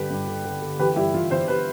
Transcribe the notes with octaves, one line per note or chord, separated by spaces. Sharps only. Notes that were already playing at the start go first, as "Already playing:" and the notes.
Already playing: G2 D3 G4 B4
G2
D3
D3
D3
E3 G4 B4
G2 E4 G4
E3 F4
E3 C5 E5
E3 G4 B4